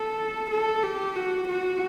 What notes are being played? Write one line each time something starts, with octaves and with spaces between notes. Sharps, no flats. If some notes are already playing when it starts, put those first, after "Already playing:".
Already playing: A4
A4
G4
F#4
F#4